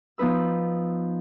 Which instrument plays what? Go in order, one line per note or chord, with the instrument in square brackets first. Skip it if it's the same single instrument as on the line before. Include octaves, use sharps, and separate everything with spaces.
[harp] F3 B3 D#4 B4 E6